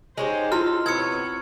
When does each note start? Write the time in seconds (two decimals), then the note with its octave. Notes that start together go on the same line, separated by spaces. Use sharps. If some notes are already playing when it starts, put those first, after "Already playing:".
0.18 G#3 C#4 D#4 G4 C5
0.52 E4 F4 A4 C6 F6
0.86 C3 B3 E4 C#5 E6 G#6 C#7